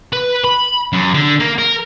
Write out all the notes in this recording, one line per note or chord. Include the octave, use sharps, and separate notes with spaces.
B4
B5
F#2
D3
A#3
A#4